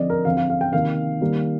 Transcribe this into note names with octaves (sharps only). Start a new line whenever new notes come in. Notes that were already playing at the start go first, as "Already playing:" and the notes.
Already playing: D3 F3 C4 D5 D#5
A#4
D3 F3 C4 F5
F5
F5
G5
C3 D#3 A#3 F5
D#3 G3 A#3